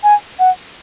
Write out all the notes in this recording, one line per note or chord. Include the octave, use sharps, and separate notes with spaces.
G#5
F#5